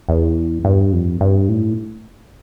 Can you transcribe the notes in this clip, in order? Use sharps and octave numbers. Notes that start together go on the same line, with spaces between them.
E2
G2
F2
G2
A2